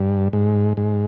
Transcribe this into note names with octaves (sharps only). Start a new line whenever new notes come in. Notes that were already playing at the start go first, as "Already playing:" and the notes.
Already playing: G2
G#2
G#2